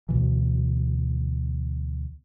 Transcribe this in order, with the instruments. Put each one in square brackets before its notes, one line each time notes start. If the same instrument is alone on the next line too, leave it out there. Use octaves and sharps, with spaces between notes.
[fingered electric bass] D2 B2 E3